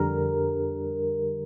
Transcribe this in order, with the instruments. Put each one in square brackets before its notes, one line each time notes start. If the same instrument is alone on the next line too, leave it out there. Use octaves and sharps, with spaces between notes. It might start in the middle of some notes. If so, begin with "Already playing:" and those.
Already playing: [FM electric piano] F2 D3 G3 A#4